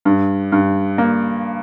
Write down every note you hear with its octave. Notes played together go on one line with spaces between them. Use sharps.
G2
G2
A#3